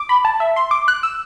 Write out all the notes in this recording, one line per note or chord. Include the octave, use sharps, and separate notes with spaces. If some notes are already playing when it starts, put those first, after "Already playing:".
Already playing: D6
B5
A5
E5
C6
D6
F#6
E6